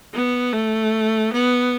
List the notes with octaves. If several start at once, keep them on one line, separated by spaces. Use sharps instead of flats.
B3
A3
B3